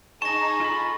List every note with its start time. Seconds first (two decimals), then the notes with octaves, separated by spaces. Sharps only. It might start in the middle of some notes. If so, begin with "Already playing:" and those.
0.22 D#4 G#4 A5 C#6 A#6
0.60 F4 A4 B5